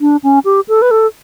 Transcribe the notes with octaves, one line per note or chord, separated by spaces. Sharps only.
D4
C#4
G4
A4
B4
A4